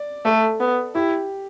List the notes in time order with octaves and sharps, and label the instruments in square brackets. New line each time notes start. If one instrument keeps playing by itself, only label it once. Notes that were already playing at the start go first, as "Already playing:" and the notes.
Already playing: [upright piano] D5
[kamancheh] A3 [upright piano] A4
[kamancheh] B3
[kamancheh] E4 [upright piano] G4